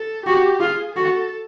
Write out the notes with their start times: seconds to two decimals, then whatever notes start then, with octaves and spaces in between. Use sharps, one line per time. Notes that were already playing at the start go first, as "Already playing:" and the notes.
Already playing: A4
0.26 F#4 G4
0.60 F4 G#4
0.95 F#4 A4